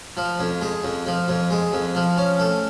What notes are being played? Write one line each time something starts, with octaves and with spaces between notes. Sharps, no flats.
F3
F2
G#3
F2
F3
F2
G#3
F2
F3
C#4
A3